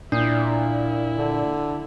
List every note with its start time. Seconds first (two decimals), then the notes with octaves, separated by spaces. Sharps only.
0.12 A#2 D4 E4
1.18 D3